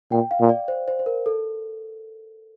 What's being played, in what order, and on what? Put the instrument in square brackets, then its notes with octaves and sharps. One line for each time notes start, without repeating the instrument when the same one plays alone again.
[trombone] A#2 [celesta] G5
[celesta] F5
[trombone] A#2
[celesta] D5
C5
C5
C5
A#4
A4